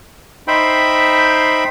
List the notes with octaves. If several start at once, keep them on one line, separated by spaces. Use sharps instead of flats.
D#4 C5 E5 G5 B5